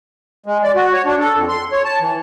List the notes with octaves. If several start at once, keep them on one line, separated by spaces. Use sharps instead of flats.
G#3
D5
F#4
C#5
D4
A4
F2
C6
C#5
A5
E3